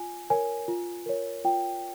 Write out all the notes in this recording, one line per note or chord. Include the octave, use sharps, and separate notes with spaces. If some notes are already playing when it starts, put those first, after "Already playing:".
Already playing: F4 G#5
A#4 C#5 G#5
F4
A#4 C#5
F4 G5